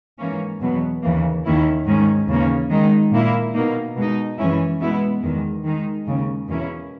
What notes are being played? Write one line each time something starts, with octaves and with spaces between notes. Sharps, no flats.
G#2 E3 A#3 C#4
E2 B2 F#3 B3
D#2 C#3 E3 A#3
D#2 D#3 A#3 C#4 E4
G#2 D#3 G#3 C#4
D#2 C#3 E3 A#3 C#4
D#3 G#3 D#4
A#2 A#3 E4
B2 A#3 D#4
B2 G#3 D#4
F#2 E3 G#3 C#4 E4
B2 G#3 B3 E4
E2 D#3 G#3
D#3 G#3 D#4
D#2 C#3 G#3
E2 B2 A#3 C#4 E4